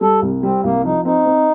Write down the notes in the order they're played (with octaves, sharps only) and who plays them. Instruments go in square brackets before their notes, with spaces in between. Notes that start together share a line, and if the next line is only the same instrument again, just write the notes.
[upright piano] G3 [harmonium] A4
[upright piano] C2
[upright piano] G3 [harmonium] C4
[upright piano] C2 [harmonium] A#3
[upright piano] F3 [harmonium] D#4
[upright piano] C4 [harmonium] D#4
[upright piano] C4